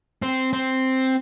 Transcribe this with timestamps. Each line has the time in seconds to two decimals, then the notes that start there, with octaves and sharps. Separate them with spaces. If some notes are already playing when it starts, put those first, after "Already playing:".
0.22 C4
0.53 C4